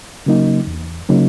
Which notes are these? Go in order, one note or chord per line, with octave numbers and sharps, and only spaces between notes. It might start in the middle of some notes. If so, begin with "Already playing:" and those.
C#3 F#3 A#3 D#4
E2
C#3 F#3 A#3 D#4